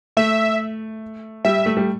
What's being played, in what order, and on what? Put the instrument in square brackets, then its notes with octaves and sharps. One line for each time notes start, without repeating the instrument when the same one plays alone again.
[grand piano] A3 [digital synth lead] E5
[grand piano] G3 [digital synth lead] E5
[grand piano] A3
G3